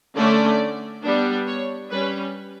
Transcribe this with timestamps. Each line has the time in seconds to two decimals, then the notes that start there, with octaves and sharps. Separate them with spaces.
0.16 D3 A3 C#4 D5
1.04 G3 B3 D4
1.47 C#5
1.90 G3 C#4 B4